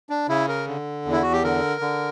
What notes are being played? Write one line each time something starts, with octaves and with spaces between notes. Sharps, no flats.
D4
C#3 E4
A#4
D3
E2
E4
F#4
G4
D3 A#4
D3